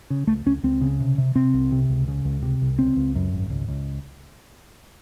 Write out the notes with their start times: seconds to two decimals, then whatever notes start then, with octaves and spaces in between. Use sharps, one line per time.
0.10 C#3
0.27 C#2 A3
0.46 C#2 C#4
0.63 C#2 C4
0.81 C#3
1.00 C3
1.18 C3
1.35 C3 C4
1.54 C2
1.72 C3
1.89 C#2
2.08 C#3
2.25 C#2
2.42 C3
2.62 C2
2.79 C#2 C4
2.96 C#2
3.15 F#2
3.33 G#1
3.50 C#2
3.68 C#2